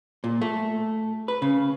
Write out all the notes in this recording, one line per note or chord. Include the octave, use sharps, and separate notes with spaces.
A#2
A3
B4
C#3